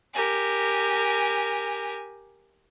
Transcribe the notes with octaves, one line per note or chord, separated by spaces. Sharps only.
G4 A#4 G#5